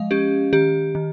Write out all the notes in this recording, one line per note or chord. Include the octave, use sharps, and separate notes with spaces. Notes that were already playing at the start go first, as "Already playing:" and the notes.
Already playing: F3 G#3 D#5 F5
C#4 G4
D#3 G4
D#3